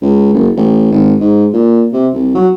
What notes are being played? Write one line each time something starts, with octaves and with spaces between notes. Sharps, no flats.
C#2
F#1
A1
G#1
G#2
A#2
C3
C2
F#3